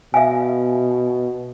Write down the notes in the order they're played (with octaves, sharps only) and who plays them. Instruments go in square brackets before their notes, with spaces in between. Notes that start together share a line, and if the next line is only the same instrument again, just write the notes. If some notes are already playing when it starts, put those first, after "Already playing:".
[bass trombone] B2 [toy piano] E5 F5 G#5